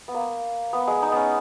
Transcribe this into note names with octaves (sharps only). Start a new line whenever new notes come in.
B3
A#3
B3
G#3
D#4
B3 C#4